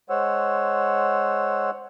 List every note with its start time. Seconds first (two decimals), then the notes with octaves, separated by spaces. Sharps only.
0.10 G#3 C5 C#5 F#5 E6